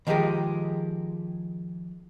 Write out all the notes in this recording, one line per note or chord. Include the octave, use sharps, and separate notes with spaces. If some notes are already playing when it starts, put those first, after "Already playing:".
D#3 F3 G#3 G4 G#4 A#4